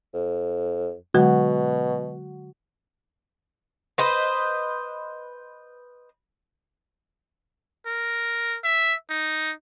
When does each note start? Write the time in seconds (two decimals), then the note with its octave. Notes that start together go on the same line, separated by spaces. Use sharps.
0.14 F2
1.14 B2 D3 F#3 G#3 F#4
3.98 B4 C5 D#5
7.86 A#4
8.64 E5
9.10 D#4